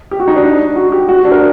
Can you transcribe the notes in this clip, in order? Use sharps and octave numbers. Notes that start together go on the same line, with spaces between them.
G4
F#4
D#4
D4
D#4
F#4
G4
F#4
D4
A#4